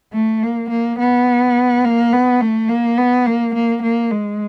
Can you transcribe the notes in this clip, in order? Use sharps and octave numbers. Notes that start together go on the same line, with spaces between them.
A3
A#3
A#3
B3
A#3
B3
A3
A#3
B3
A#3
A#3
A#3
G#3